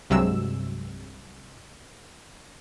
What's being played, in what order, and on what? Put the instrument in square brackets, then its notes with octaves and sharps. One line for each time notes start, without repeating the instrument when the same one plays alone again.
[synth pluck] C2 G2 C3 F#3 G#3 E6